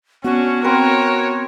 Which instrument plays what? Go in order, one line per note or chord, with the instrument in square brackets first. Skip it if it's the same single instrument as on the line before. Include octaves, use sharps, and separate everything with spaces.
[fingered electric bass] B3 [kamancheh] C#4 D4 [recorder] F#4
[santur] C4 B4 [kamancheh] A#4 C#5